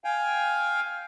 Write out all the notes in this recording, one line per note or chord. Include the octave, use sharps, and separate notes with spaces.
F5 G5 G#5